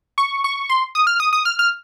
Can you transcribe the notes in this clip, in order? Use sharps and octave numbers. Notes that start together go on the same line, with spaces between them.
C#6
C#6
C6
D#6
F6
D#6
D#6
F6
F6